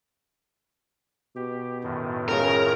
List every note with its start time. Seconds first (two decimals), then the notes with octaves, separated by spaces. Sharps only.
1.36 B2 G4
1.83 F#2 A2 D#3
2.29 C#2 C#3 A#4